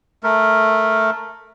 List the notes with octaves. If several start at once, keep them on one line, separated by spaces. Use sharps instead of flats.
A3 A#4